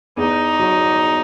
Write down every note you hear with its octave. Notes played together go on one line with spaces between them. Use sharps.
E2 D#4
F#3